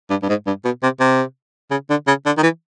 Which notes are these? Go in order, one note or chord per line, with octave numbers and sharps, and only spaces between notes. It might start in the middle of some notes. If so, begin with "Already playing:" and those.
G2
G2
G#2
G2
B2
C3
C3
C#3
D3
C#3
D3
D#3
E3